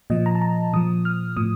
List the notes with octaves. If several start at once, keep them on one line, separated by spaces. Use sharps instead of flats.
A#2 F3 D#5
A#5
A5
A#5
A#2 F3 D#6
F6
A2 F3 D#6